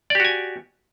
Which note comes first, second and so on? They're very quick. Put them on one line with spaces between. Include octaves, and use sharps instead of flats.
D5 G4 F#4 G#5